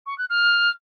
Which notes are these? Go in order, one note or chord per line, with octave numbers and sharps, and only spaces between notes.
C#6
F#6
F6